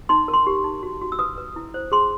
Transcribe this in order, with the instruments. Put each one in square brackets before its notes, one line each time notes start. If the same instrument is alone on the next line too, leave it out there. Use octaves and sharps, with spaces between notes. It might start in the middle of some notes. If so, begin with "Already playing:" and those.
[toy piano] D#4 C6
A#4
C6
G4
D#4
F#4
F#4
E6
B4 D#6
B4
E4
C5
G#4 C6